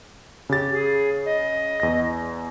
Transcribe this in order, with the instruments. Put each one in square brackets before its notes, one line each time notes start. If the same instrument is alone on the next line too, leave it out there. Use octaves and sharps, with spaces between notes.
[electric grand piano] C#3 A6 [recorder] G4
[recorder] G#4
D#5
[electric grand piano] E2 A#6